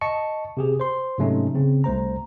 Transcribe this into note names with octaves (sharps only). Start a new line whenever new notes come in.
D#5 A5 C#6 C#7
C3 G4 G#4
C5 C6
G#2 C3 F#3 A3 C#4 D#4
C#3 C4
C2 A3 C5 A#5